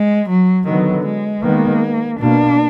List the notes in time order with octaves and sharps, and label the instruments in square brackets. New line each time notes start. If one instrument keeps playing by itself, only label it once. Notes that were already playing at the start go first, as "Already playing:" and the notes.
Already playing: [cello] G#3
F#3
[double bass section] D3 F#3 B3 [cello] D#3
[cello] G#3
[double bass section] D#3 G#3 B3 [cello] A#3
[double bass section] B2 A#3 [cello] D4